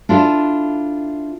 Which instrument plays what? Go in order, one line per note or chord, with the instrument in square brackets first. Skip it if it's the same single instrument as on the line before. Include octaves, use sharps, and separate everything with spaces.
[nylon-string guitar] D4 E4 F4 A4 E5